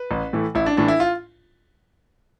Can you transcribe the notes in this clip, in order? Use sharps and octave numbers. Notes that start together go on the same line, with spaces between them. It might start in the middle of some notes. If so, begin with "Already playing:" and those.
Already playing: B4
A1
A2 E3 A3
A1 E4
D4
A2 E3 A3 D4
E4
F4